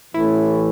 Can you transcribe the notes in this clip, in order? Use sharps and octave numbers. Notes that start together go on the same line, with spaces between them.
A1 A2 E3 E4